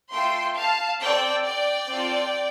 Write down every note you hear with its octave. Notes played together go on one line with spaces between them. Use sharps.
A3 F4 A4 G5 C6
F5 A5
C4 A4 D5 G5
D5 G5
C4 F4 A4